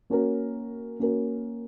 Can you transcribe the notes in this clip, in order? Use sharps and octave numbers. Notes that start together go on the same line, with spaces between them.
A#3 C#4 F#4 A#4
A#3 C#4 F#4 A#4